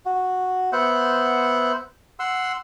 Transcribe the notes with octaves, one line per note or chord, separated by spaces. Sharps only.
F#4
B3 C5 E5 F#5
F#5 C6 E6